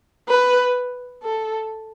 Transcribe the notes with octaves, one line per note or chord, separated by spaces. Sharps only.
B4
A4